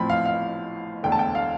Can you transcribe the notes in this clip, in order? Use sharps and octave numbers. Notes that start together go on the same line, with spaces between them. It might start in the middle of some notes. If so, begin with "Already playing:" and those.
Already playing: A1 A2 F3 C4 B5
F5
F5
E1 D2 D3 A3 G5
A5
G5
F5